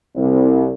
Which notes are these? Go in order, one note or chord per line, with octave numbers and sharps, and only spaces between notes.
C2